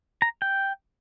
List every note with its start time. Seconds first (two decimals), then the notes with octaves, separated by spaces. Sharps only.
0.22 A#5
0.42 G5